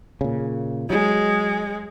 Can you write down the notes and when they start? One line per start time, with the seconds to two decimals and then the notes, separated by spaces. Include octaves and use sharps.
0.21 A#2 C#3
0.90 F#3 G#3